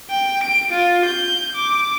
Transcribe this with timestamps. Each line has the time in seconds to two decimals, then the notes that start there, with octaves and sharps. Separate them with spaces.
0.11 G5
0.43 D7
0.72 F4
1.06 G6
1.55 D6